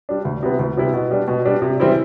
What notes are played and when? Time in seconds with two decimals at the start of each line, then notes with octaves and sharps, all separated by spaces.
0.09 G3 D4
0.25 D2
0.43 C3 G3 B3 E4
0.59 D2
0.77 C3 G3 B3 E4
0.93 B2
1.11 G3 D4
1.28 B2
1.45 G3 D4
1.62 C3
1.80 E3 G3 C4 E4